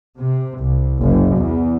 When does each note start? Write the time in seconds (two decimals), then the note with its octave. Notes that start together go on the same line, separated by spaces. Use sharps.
0.18 C3
0.59 C2
1.00 F#1
1.37 E2